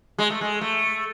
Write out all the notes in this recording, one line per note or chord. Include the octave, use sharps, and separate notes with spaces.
G#3
A3
G#3
A3